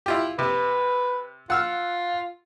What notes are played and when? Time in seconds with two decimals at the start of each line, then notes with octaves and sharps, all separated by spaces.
0.06 E4 F4 G4
0.39 C3 B4
1.50 F4 F#5 E6 F6